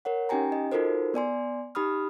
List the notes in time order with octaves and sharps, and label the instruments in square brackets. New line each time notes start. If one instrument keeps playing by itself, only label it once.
[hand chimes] A#4 C#5 F#5
C#4 D#4 G4 G5 G#5 A#5
D#5
D#4 F4 F#4 A4 A#4 C5
B3 D5 G#5 C6
D#4 G4 B5 D#6 F6